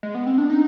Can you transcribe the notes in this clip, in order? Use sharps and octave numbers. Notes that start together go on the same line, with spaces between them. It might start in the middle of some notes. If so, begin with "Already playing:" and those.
G#3
B3
C4
D4
D#4